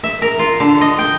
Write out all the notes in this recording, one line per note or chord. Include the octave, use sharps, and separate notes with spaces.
E5
A#4
F4
D3
D#5
G5